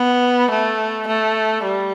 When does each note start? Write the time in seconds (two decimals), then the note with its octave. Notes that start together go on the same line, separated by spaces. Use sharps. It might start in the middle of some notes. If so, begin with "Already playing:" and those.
Already playing: B3
0.51 A3
1.07 A3
1.64 G3